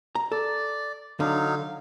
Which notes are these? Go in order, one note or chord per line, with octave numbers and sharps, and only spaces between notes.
A#5
A4 D5
D3 F#3 D#4 F5